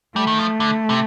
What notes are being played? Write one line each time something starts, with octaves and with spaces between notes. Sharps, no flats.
G3 A3
D#3
F3
D3
C3